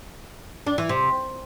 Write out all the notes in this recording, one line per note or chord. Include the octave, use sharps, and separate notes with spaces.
D4
E3
C3